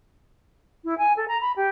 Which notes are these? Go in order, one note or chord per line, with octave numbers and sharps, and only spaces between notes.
E4
G#5
A4
A#5
B5
G4